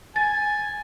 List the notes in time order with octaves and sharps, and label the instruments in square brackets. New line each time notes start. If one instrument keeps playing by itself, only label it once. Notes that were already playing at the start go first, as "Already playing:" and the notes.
[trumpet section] G#5 [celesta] A6